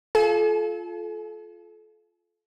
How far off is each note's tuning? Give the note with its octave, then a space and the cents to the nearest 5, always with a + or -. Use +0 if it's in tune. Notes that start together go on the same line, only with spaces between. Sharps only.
F4 -5 A4 -30 G#5 +40